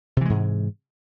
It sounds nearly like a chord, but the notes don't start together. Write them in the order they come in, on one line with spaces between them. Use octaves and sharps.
C3 E3 G#3 G#2